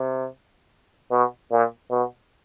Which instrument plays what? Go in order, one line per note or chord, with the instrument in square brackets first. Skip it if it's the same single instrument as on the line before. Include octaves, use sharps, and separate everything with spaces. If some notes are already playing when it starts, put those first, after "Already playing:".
Already playing: [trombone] C3
B2
A#2
B2